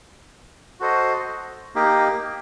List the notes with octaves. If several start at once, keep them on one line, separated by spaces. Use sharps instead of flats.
F#4 A4 C5 D#5
A#3 D#4 G4